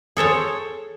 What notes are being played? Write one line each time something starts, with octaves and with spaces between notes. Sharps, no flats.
G#4 A4 C5 C#5